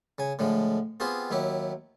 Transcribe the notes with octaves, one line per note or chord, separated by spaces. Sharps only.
C#3 G#5
A2 D3 F3 G#3
B3 C4 F4 G4 G#4 C5
D#2 F#3 E4 G4